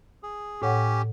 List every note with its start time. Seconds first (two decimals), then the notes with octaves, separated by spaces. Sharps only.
0.23 G#4
0.62 A2 C#4 G4 C#5 F#5